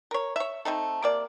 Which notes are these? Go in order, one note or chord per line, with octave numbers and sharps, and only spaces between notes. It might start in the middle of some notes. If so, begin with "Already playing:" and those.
A#4 C#5
C#5 E5
A3 C4 D#4 A4
C3 A#3 D5